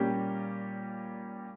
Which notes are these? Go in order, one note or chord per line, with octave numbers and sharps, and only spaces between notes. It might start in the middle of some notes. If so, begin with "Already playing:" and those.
Already playing: A#2 G3 C#4 G4 A#4